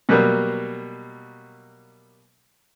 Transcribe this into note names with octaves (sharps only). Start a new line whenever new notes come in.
B2 F#3 G3 A#3